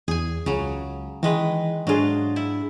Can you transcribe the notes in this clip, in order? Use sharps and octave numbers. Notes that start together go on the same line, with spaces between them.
E2 G#4 G#5
C#2 C#3 F#3
D#3 E3 G#3 B4
G#2 F#3 D4 F4 G#4
E4